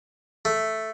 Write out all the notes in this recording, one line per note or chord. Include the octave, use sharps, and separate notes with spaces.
A3